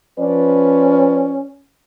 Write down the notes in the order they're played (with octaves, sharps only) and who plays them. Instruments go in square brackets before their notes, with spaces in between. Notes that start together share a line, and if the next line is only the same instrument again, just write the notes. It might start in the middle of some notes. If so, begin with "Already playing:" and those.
[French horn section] F3 B4 D5 [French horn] C#4